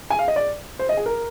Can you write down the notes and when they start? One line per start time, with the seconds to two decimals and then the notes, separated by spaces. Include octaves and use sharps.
0.10 G#5
0.19 F5
0.28 D#5
0.36 D5
0.79 C5
0.89 D#5
0.97 G#4
1.06 A#4